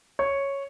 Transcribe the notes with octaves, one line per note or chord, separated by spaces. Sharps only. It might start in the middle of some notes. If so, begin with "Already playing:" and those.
C#5